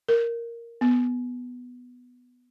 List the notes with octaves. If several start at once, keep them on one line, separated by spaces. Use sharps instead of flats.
A#4
B3